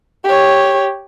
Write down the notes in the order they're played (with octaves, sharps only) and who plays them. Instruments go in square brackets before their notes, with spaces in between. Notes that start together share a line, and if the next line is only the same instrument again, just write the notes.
[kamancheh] G4 C#5